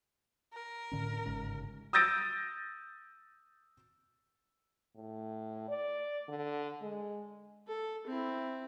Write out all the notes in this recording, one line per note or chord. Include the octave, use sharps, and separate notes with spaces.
A#4
A2 D3 C#4
G1 G#2 C#3
D#6 E6 G6 A6 A#6 D7
A2
D5
D3
G#3
A4
C4 E4